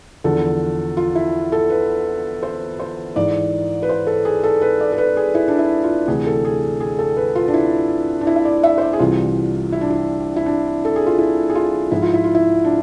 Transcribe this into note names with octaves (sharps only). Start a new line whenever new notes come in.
E2 D3 F3 A4
F4
E4
A4
B4
C5
C5
G#2 E3 D5
B4
C5
A4
G#4
A4
B4
D5
A4
B4
G#4
E4
D4
E4
F4
D2 C3 E3 G#4
A4
G#4
G#4
A4
B4
F4
D4
E4
D4
E4
E5
D5
E5
C5
D5
G#4
C2 C3 E3 F4
E4
D4
E4
E4
D4
A4
G#4
F4
E4
G#4
F4
G#2 F3 E4
F4
E4
F4
E4
D4